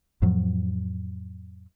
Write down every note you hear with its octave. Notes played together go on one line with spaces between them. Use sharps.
F2 A2 F3 F#3